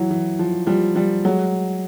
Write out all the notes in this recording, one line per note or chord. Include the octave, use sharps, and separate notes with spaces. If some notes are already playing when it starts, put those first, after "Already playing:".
Already playing: E3 F#3
E3
F3
F3 G3
F3 G3
F#3 G#3